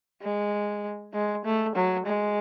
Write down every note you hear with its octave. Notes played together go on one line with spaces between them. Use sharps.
G#3
G#3
A3
F#3
G#3